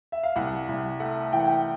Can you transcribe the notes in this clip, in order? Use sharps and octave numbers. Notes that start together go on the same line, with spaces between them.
E5
F5
C2 F#5
C2
A3 F#5
E3 G5
F#5
G5